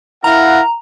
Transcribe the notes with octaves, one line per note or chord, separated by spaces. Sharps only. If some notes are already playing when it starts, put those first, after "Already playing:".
E4 A#4 F5 F#5 A#5